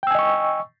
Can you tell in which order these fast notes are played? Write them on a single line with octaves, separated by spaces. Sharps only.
G5 E6 G#5 D#5 C#6